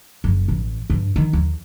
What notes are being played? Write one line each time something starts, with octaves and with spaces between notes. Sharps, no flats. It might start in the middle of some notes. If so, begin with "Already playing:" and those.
F#1
A1
G2
D#3
D#2